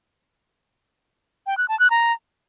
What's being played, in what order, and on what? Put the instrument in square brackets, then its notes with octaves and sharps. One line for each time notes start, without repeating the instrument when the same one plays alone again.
[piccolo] G5
F#6
A5
F#6
A#5